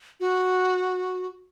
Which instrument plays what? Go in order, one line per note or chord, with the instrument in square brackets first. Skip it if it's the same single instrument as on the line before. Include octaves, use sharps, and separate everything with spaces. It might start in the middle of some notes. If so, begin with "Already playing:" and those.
[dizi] F#4